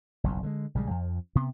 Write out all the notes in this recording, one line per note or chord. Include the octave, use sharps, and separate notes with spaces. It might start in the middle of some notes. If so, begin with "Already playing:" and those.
F#1 B1 E2
D3 G3 G#3
A#1 C#3 G3 G#3
F2 F3
C3 B3